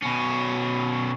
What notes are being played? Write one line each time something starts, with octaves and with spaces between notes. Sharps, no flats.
B2 C#4